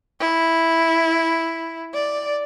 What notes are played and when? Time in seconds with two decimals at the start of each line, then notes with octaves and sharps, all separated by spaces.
0.20 E4
1.94 D5